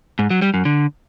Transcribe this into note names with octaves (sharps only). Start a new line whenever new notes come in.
G#2
F#3
G3
F#2
D3